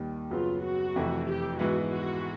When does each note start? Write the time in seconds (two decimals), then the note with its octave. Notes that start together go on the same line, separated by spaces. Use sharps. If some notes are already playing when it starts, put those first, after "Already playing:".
Already playing: D#2 D#3 G3
0.31 F#2 C#3 F#3 B3 F4
0.63 F#4
0.96 F2 C3 E3 A3
1.28 G4
1.59 G#2 E3 G#3 B3 F#4
1.91 F#4